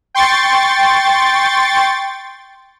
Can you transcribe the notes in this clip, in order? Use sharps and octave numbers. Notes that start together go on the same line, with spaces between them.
G5 C6 C#6 A6